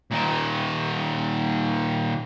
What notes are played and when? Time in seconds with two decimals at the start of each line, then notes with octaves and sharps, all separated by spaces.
0.11 A#2 D#3